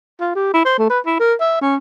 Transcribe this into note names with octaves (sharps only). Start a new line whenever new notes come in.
F4
G4
E4
C5
A3
B4
E4
A#4
E5
C#4